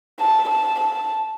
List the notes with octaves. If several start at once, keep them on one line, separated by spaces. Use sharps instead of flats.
A5
A5
A5